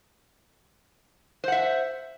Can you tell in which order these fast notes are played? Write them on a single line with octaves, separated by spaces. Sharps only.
C5 F#5 E5